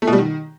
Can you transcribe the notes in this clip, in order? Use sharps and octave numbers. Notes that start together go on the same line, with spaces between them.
A3
B2
G3
D#3